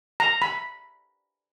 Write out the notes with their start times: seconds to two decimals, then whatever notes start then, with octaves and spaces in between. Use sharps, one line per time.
0.20 A#5
0.42 B5